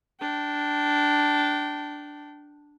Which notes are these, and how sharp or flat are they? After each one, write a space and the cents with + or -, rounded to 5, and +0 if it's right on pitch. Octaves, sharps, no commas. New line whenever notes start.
D4 +0 G5 -25